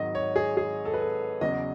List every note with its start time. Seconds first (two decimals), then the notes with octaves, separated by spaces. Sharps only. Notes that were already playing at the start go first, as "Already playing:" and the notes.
Already playing: G#1 G#2 D#3 F#3 D#5
0.15 C#5
0.36 G#4
0.57 G#4
0.85 A4
0.94 B4
1.01 A4
1.41 E2 C#3 F#3 D#5